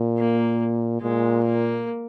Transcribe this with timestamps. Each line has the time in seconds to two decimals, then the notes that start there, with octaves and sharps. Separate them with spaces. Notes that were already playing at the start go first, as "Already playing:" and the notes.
Already playing: A#2
0.18 A#3
1.02 A#2 G#3
1.44 A#3